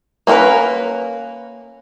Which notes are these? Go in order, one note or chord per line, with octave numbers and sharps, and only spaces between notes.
A#3 C#4 F#4 A#4 B4